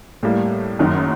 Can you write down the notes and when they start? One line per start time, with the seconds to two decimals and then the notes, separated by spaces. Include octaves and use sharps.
0.23 A2 G3 A#3
0.79 F#1 F#2 D#3 F#3